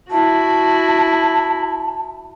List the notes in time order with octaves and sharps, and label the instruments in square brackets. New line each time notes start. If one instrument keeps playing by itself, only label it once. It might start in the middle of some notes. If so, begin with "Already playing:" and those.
[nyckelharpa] E4 F#4 [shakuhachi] A5